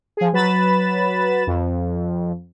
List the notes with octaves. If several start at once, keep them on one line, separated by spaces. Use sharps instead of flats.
F3 G#4
F#3 B4 B5 A6 E7
F2